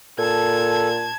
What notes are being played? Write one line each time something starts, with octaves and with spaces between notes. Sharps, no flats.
A#2 A4 A5 G#6